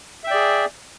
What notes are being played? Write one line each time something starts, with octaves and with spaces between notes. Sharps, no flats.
G#4 D5 E5 G5